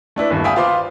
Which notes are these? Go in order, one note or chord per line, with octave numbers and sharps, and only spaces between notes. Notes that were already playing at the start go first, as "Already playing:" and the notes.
A3 D4 E4 B4
G1 D#2
E5 F5 G5 G#5 B5 D#6
F4 B4 C5 F5 C6 D6